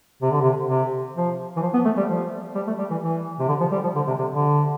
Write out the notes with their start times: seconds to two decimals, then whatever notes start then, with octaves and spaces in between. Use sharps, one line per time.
0.22 C3
0.32 D3
0.42 C3
0.69 C3
1.16 F3
1.56 E3
1.62 F3
1.74 B3
1.85 A3
1.97 G3
2.09 F3
2.55 G3
2.67 A3
2.78 G3
2.90 E3
3.02 E3
3.39 C3
3.48 D3
3.60 F3
3.72 G3
3.84 F3
3.96 D3
4.07 C3
4.19 C3
4.30 D3